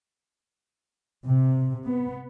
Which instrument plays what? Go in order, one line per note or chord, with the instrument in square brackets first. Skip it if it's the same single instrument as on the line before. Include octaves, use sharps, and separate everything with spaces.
[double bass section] C3
B3